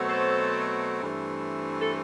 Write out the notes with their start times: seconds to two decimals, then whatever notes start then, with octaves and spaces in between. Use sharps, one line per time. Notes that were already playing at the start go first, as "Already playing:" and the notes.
Already playing: B2 F#3 A3 C4
0.09 A4 C5
1.01 G2 E3 A3 C4
1.81 A4